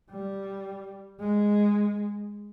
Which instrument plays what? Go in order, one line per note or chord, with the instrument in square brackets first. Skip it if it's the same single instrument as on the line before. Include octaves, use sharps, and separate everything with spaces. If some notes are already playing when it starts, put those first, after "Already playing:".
[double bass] G3
G#3